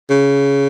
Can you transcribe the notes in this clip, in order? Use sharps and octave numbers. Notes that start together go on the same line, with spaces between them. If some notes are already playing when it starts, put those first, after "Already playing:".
C#3